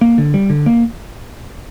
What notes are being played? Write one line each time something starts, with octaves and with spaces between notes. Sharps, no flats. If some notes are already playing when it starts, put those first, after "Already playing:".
A#3
D3
G3
D3
A#3